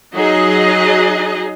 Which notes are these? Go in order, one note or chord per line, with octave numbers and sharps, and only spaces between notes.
F#3 D#4 G#4 D#5